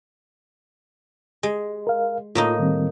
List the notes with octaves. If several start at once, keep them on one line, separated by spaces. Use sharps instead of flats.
G#3
A#4 F5
A2 A#3 D#4 F4
D#3 G3 C4